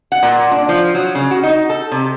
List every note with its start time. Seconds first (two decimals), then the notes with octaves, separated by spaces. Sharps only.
0.12 F#5
0.23 A#2
0.52 D4
0.69 F3
0.94 F#3
1.15 C#3
1.31 F#4
1.43 D#4
1.69 A4
1.92 C3